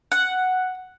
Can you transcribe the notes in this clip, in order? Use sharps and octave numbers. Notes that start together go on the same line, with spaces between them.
F#5